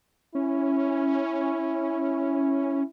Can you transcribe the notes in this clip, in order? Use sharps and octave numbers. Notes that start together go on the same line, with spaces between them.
C#4 E4